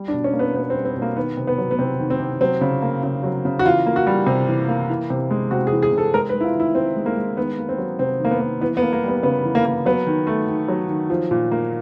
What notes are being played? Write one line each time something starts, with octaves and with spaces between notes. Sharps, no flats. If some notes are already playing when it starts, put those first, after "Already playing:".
Already playing: G3
D4
B2
C#4
A#3
B3
B2 B3
C4
G3
C4
B2
A#3
D#3 B3
C3
B3
F#3
B3
C3 C4
D#3
C4
C3
F#3 C4
C#3
A#3
C#3
F#3
C#3
F#4
E3 F4
A#3
F#4
G3
C3
E3
A#3
E3
C3
G#3
C3 F#4
G#4
E3
G#4
C3
A4
G#3 A#4
B4
G#3
E4
F4
D#3 E4
D#3 C4
G#3
A#3
G#3
D#3 B3
A#3
C4
F#3
C3 C4
D#3 A#3
B3
A#3
E3 B3
B3
A#3
A#3
G3 B3
C#3 B3
E3
A#3
A#3
F#3 B3
D#3
A3
D#3
F#3
D#3
F3
A#2
A#3